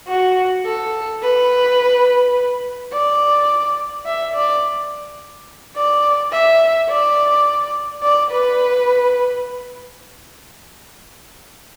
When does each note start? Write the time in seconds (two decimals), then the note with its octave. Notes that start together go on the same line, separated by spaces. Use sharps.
0.08 F#4
0.65 A4
1.23 B4
2.92 D5
4.06 E5
4.34 D5
5.76 D5
6.32 E5
6.89 D5
8.03 D5
8.31 B4